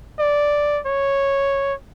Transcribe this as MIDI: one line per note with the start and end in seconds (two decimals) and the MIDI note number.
0.19 0.80 74
0.86 1.74 73